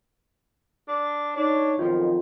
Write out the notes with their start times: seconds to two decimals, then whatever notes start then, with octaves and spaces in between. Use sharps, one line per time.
0.88 D4
1.36 D4 D#4 C#5
1.79 B1 F2 D#3 F3 F4